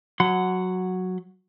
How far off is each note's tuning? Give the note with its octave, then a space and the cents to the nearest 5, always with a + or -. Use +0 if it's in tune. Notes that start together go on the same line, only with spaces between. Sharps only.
F#3 -5 F#5 +0 C6 -45